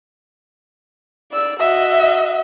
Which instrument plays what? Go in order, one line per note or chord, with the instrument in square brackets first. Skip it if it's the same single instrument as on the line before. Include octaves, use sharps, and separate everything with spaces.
[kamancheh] D5 E6
[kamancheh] F#4 D#5 [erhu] E5